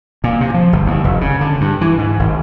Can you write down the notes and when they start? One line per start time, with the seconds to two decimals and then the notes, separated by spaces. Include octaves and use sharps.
0.24 A#2
0.41 C3
0.54 F3
0.73 G1
0.86 D#2
1.04 F1
1.21 C#3
1.41 D3
1.61 G2
1.81 E3
1.98 G#2
2.19 G#1